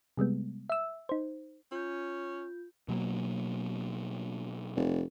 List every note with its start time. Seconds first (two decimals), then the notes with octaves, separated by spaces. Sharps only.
0.17 C3 G3 G#3 B3
0.70 E5 E6
1.09 D#4 C5
1.72 C#4 F4 G6
2.88 B2 F#3 A#3
4.76 F1